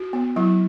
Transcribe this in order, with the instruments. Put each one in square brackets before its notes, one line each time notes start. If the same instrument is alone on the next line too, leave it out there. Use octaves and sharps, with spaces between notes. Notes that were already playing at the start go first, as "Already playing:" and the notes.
Already playing: [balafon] F#4
B3
F#3 E4